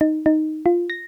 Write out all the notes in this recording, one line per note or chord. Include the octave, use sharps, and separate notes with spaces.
D#4
D#4
F4
A#6